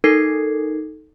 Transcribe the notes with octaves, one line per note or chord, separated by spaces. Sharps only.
D#4 A4 A#4 G#6 C7